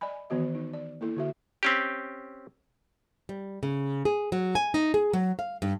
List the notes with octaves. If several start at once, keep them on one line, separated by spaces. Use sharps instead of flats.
D5 D#5 G#5 B5
D#3 E3 B3 F#4 D#5
D#4
D5
A#3 E4 A4
D3 F#4 E5
C4 C#4 G4
G3
C#3
G#4
F#3
G#5
D#4
G#4
F#3
F5
G2